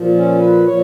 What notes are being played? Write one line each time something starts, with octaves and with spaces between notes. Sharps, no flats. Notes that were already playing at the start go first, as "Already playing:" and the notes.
Already playing: A#2 F3
C#4
B4
A#2 F3 C#5